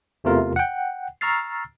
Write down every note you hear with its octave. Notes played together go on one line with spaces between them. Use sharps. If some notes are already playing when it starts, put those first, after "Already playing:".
E2 C3 E3 A3 F4 A#4
F#5 G5
A#5 C#6 E6 F6 A6 C7